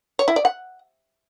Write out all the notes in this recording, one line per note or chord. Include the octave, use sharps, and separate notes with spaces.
C#5
E4
D5
F#5